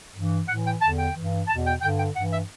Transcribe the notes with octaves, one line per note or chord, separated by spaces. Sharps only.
G2 E3
A2 E3 F#5
G5
E2 D3 A5
G5
G2 E3
E2 B2 A5
G5
G2 D3 G5
G5
G2 E3 F#5
E5